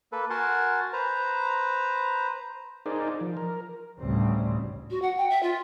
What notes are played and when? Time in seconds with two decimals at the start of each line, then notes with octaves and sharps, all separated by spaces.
0.12 A#3 A4 B4
0.30 F#4 A#4 F#5 G#5 A5 C6
0.93 B4 C5 A#5
2.86 D#4 G#4 A#4 C5 D5
3.21 F3
3.37 A#4
3.99 A1 D2 A2 C#3 G3 C4
4.90 F#4
5.02 F#5
5.17 G5
5.30 E5
5.43 F4